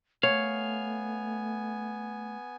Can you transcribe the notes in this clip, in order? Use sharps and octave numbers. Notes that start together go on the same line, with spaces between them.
A3 B3 C#5 F5 G#5